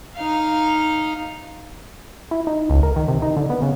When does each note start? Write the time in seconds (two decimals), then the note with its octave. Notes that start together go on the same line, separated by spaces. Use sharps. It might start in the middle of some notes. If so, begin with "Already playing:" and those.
0.16 D#4 F5
2.31 E4
2.47 D#4
2.70 C#2
2.83 A#4
2.96 D#3
3.08 C3
3.22 D#4
3.37 D3
3.50 B3
3.62 C#3